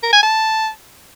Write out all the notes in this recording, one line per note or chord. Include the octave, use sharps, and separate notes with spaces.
A#4
G#5
A5